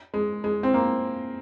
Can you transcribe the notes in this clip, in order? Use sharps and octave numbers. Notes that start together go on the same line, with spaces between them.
G#3
G#3
C4
A#3